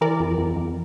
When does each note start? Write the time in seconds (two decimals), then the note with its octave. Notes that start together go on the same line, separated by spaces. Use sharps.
0.01 E3 A#4 D5
0.20 F2
0.38 F2
0.56 F2